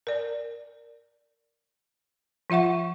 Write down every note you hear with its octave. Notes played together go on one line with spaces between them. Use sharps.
A#4 D5
F3 F4 E5 F#5 C#6